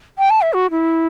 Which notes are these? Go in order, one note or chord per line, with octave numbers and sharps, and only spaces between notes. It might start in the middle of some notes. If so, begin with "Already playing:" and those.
G5
A5
E5
F#4
E4